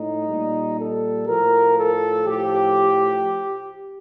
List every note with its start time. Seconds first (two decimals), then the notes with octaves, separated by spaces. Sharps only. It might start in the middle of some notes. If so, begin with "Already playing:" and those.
Already playing: A2 D#4
0.28 A#2 G3
0.78 A4
1.27 A2 F3 A#4
1.77 A4
2.27 A2 F3 G4